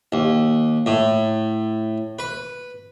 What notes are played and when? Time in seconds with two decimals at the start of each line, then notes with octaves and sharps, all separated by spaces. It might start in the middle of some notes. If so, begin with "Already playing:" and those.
0.12 D#2
0.86 A2
2.19 B4